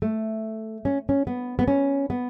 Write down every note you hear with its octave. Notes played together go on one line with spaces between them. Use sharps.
A3
C#4
C#4
B3
B3
C#4
B3